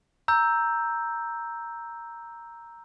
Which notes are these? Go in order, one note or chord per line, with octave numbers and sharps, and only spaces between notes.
A#5 E6 G6